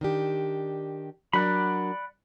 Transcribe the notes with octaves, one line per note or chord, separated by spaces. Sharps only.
D#3 D4 G4
F#3 D4 A#4 D5 F#5 B5